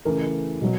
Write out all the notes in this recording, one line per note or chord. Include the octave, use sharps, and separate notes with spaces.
C#3 E3 A3 A#4
B2 F#3